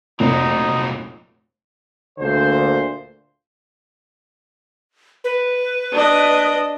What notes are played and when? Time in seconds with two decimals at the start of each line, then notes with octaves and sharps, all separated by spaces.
0.20 F1 A#2 F#3 D#4
2.19 D2 A#2 D3 C5
5.24 B4
5.93 D4 D#5